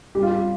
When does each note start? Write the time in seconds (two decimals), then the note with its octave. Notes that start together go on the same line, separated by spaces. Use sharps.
0.15 G3 G4
0.23 F4
0.31 G4